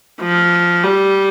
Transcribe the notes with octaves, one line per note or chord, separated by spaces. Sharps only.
F3
G3